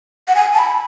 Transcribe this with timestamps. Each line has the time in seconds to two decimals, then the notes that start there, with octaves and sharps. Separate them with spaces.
0.28 F#5
0.35 G#5
0.54 A5
0.59 B5